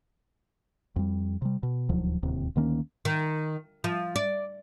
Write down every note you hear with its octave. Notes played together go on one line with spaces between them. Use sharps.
F2 G3
C3 G3
B2
D#1 D2 F3 F#3
D1 D#2 C3
D2 D#3 A#3 C#4
D#3
F3
D5